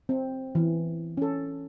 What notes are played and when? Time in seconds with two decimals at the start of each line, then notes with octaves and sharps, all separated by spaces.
0.09 C4
0.55 E3
1.17 C#4 A4